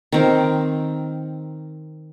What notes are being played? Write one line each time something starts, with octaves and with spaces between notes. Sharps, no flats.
D#3 C4 A#4